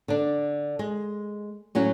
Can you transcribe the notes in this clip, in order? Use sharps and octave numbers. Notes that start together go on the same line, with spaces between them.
D3 D4
G#3
A2 F#3 C#4 F#4